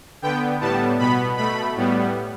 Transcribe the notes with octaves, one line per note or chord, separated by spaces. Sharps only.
D3 B3 G5
A2 G3 B3 A5
B2 B3 B5
B2 A3 B5
A2 G3 B3